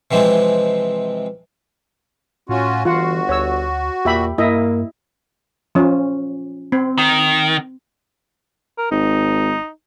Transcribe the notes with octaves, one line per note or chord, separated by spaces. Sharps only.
C3 E3 F3 G#3 C4
A2 C#4 F4 F#4
G1 E3 F4 F#4 F#5
D2 C#5 E6
E2 A#2 G4 E5 B5
G2 A#3 E4 D#5 E5
F3 C#4
C4
D#3
A#4
G#1 D#4